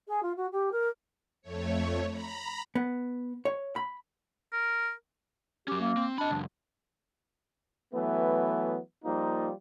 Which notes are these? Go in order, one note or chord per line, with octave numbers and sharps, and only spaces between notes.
G#4
F4
F#4
G4
A#4
F2 A3 C#5
A#5 B5
B3
C#5
B5
A#4
F#3 C#4 G4
A#3
C4
D4 D#5 B5
C#2 F#2
E3 F#3 A3 B3
F3 G3 A#3 D#4 F4